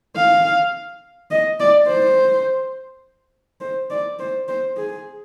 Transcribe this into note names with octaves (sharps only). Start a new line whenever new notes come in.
F5
D#5
D5
C5
C5
D5
C5
C5
G#4